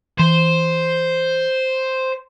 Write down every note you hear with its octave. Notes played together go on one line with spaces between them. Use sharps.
E3 C5